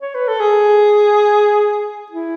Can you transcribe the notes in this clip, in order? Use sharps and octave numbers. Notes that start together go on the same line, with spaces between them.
C#5
B4
A4
G#4
E4